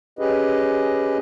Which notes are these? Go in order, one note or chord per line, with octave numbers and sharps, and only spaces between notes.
C#4 G4 G#4 B4 D#5